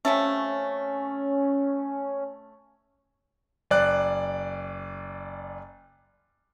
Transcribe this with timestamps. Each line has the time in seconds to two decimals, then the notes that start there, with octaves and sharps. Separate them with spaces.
0.05 C3 F3 A3 C#4
3.71 F#1 D5 F#6